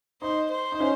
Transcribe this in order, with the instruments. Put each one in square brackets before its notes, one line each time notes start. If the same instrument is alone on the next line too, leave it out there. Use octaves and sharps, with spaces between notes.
[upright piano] D#4 [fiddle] C5
[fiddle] C5
[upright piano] D#4
C#4